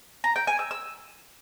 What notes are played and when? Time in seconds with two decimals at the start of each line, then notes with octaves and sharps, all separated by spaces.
0.24 A#5
0.36 G5
0.47 G#5
0.59 E6
0.71 E6